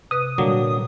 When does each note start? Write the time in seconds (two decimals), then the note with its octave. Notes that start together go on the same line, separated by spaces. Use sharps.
0.11 C3 B4 D#6 F#6
0.38 A#2 D3 F#3 G3 A#3